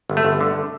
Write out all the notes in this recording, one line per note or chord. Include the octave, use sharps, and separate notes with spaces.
G1
A3
G1
D3